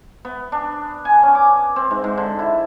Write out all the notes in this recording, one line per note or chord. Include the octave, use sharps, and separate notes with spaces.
B3
D4
G#5
C#4
D6
C4
G#2
G#2
D3
E4